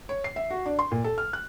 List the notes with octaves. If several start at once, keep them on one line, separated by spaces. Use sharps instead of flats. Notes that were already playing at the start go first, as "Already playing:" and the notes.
C#5
C7
E5
F#4
D4
C6
A#2
A4
F6
F#6